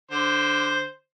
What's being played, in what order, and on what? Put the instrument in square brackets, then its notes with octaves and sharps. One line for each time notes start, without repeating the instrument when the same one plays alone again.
[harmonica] D3 C5